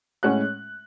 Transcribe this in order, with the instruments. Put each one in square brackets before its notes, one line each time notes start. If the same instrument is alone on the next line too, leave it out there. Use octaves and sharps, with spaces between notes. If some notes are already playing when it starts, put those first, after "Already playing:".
[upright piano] A2 G#3 C#4 F#5 F#6